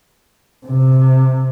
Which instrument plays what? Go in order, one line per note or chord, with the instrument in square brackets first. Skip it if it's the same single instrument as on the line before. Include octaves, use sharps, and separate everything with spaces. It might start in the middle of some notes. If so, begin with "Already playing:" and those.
[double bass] C3